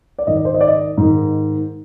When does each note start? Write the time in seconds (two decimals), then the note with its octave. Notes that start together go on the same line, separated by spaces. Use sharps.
0.18 D5
0.27 G#2 D#3 D#5
0.37 D5
0.45 C5
0.54 D#5
0.61 D5
0.68 D#5
0.97 G#2 D#3